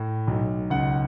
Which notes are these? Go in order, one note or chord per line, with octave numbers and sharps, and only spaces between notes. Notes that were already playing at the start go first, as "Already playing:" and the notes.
Already playing: A2
B1
C#2 F#5